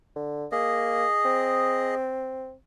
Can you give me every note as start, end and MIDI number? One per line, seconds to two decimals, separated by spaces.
0.16 0.46 50
0.52 1.05 58
0.52 1.95 68
0.52 1.95 75
1.25 2.53 60